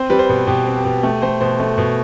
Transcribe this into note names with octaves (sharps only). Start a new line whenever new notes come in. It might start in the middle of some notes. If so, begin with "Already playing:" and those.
Already playing: C4 C5
G3 B4
C5
B2
B2 G4
C4
G4
B2
A3 G4
A3 C5
B2 C5
A3
B2